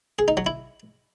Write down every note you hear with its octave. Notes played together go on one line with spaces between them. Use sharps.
G#4
D#4
F#3
E4